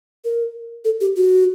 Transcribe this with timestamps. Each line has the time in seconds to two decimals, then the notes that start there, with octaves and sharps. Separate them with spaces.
0.25 A#4
0.85 A4
1.01 G4
1.17 F#4